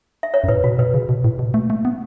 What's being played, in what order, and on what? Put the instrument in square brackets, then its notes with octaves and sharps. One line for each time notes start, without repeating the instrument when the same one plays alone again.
[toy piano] E5
C#5
[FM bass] F#2
[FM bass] A2 [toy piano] B4
[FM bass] B2 [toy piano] F#4
[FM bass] B2 [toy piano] B4
[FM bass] C#3
B2
A2
B2
A3
A3
B3